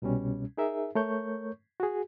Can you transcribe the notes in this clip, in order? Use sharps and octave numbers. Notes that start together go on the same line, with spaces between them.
C2 B2 G3 C#4
D#4 G#4 A#4 E5
A3 A#4 C#5 C#6 G6
F#4 G#4